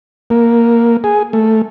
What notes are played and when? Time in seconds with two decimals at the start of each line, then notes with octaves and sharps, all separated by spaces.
0.30 A#3
1.04 G#4
1.33 A3